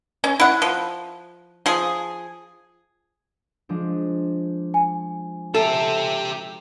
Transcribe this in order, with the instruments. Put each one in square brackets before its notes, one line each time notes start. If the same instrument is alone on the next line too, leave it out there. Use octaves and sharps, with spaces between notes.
[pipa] C#4
E4 F#5
F3
F3 G#4
[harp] F3 G#3 D4
[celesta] G#5
[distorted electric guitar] G4 E5 [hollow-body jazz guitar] A4